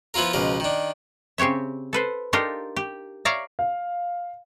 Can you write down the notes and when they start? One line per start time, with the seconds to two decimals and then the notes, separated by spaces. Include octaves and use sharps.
0.14 F3 B3 E4 F4 A#4
0.33 C#2 B2 F3 A#4
0.60 D#3 D4
1.38 C#3 C4 G4 C#5 E5
1.93 A4 B4 C5
2.33 D4 D#4 F4 G4 A4 A#4
2.76 G4
3.25 C#5 D5 E5 F5 A#5
3.59 F5